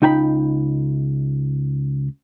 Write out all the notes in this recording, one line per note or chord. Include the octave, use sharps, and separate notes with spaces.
C#2 D#4 G5 G#5 B5